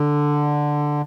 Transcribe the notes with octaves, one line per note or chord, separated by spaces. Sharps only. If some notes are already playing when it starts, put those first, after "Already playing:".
Already playing: D3